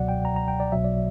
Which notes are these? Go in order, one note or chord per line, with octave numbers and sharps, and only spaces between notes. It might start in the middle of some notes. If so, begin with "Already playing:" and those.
Already playing: C#2 B2 F#3 D5 F#5
G5
A#5
A#5
G5
D5
B1 B2 F#3 E5
D5